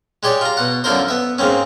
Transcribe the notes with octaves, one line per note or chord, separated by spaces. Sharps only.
G#3 G4 C#5 D5
F4 A#5
B2 F#5
F#2 D3 F3 E4 A#4 C5
B3 E5
G#2 A#3 C4 C#4